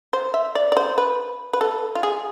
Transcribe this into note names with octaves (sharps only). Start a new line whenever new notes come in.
C5
E5
D5
D5
C5
B4
B4
A4
F4
G#4